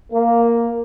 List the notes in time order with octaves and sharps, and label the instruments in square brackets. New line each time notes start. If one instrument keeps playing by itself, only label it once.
[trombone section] A#3